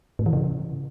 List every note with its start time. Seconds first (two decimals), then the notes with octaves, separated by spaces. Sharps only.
0.19 A2
0.26 E3
0.33 C#3